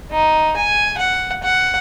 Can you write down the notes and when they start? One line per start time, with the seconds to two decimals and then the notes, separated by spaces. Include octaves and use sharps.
0.12 D#4
0.57 G#5
0.98 F#5
1.43 F#5